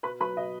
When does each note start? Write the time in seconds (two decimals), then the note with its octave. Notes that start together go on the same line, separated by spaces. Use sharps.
0.03 B2 B4 B5
0.20 F#3 B4 B5
0.37 B2 D#5